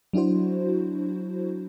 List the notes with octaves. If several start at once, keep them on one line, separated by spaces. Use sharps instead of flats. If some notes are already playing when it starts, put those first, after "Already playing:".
F#3 D4 E4 F#4 C5